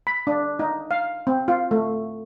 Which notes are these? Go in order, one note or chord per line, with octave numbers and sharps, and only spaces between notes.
B5
D4
D#4
F5
C4
F4
A3